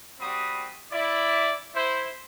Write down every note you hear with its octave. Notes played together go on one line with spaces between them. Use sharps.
G3 C4 F#4 B5 D#6
E4 D5
E4 C5